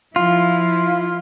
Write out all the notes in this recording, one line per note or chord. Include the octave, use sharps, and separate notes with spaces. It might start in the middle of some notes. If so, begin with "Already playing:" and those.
F3 E4 F4